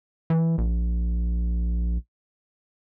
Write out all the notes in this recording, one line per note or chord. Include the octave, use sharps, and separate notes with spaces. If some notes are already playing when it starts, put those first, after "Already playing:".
E3
A#1